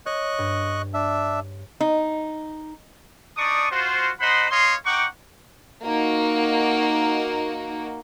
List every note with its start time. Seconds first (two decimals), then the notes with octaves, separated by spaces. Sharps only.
0.06 C#5 D#5 C#6 F#6
0.38 G2
0.94 D4 E5
1.80 D#4
3.37 D4 D#4 D5 C#6 D#6
3.72 F4 F#4 C5
4.21 D#4 C5 D#5 F#5 B5 C6
4.51 C#5 D#5 F5 C6
4.86 D#4 F#5 G5 C#6 D6
5.85 A#3 D#4 F#4